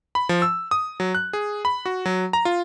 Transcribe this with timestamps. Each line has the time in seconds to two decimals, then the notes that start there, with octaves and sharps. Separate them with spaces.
0.15 B5
0.29 F3
0.42 E6
0.71 D#6
1.00 F#3
1.15 F#6
1.33 G#4
1.65 B5
1.86 F#4
2.06 F#3
2.33 A#5
2.45 F4